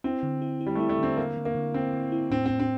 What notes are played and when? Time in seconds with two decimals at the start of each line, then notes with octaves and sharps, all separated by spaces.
0.04 C4 E4
0.23 D3
0.42 E4
0.61 E4
0.66 G3
0.75 A3 E4
0.89 A3
0.98 D3 C4
1.17 D3 A#3
1.37 D3
1.45 A#3
1.55 D3
1.74 D3 C4
1.93 D3
2.12 E4
2.31 A2 C4
2.46 A2 C4
2.59 C4